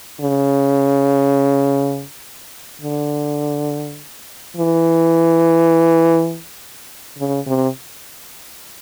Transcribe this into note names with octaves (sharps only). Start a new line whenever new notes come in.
C#3
D3
E3
C#3
C3